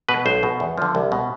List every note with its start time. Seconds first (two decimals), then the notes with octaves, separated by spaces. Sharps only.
0.09 B2 B4
0.26 B1 C5
0.43 B2
0.60 E2
0.78 D3 F3
0.95 C2
1.12 B2